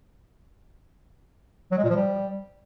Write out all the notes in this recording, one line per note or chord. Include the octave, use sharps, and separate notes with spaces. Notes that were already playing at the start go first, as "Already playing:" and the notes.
F#3
G#3
A#2
F3
G3